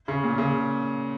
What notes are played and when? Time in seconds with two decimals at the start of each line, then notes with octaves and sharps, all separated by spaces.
0.08 C#3
0.24 A#2
0.38 C#3